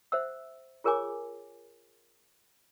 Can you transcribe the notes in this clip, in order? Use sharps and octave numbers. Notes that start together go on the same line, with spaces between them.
C5 E5 F#5 E6
F4 G#4 A#4 C#5 G#5 D6